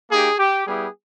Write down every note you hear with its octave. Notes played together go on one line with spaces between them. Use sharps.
A#3 D#4 G4 G#4
G4
G3 B3 E4 G4 G#4